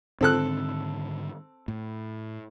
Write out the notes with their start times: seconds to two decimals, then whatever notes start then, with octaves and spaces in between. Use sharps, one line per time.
0.21 G#2 D3 D#3 C4 A4 F#6
1.68 A2